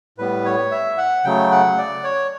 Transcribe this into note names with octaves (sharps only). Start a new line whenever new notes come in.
A2 G3 B3 B4
C#5
E5
F#5
C#3 F#3 A3 G5
F#5
D5
C#5